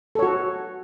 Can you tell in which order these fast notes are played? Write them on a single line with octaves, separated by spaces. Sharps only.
A4 C#5 F#4